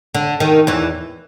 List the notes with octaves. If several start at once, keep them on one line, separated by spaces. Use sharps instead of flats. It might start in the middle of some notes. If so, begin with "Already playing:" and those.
D3
D#3
E2 E3